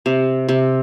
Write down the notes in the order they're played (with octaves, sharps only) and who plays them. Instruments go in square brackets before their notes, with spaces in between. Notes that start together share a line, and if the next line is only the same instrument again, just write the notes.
[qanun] C3
C3